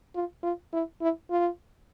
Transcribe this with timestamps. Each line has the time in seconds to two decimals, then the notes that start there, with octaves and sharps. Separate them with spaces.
0.15 F4
0.43 F4
0.73 E4
1.02 E4
1.30 F4